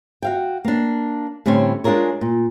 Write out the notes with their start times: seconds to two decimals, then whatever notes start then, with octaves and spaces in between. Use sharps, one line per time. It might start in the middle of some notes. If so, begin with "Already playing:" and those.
0.22 F#4 F5 G5
0.65 A#3 D4
1.46 A2 D3 G3 C4 C#4 C#5
1.84 G#3 D4 F4 G#4 A#4 C#5
2.21 A#2